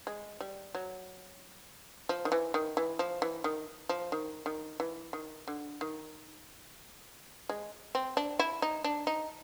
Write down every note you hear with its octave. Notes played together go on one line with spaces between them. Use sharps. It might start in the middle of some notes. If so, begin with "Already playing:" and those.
G#3
G3
F#3
F3
D#3
E3
D#3
E3
F3
E3
D#3
F3
D#3
D#3
E3
D#3
D3
D#3
G#3
C4
D4
E4
D#4
D4
D#4